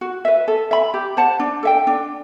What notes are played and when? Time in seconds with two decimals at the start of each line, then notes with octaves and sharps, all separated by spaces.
0.01 F#4
0.25 B4 E5
0.48 A4
0.71 E5 B5
0.94 G4
1.17 C5 F#5 A5
1.40 D4
1.63 A4 E5 G5
1.87 D4